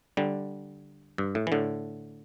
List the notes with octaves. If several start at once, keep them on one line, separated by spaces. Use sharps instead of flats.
D3 G3
G2
A2
E3
A2 D3